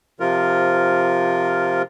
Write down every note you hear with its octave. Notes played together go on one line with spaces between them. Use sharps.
C3 F3 F4 A#4